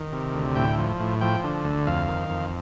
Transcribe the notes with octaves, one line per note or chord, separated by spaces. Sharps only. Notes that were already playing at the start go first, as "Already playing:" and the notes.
Already playing: D#3
C3
D2
A2 G5
F3
A2
F3 G5
D3
D2
F2 F5
D#3
F2